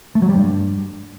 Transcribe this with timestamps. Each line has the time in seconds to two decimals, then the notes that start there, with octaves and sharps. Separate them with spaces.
0.15 A3
0.22 F#3
0.29 G3
0.36 G2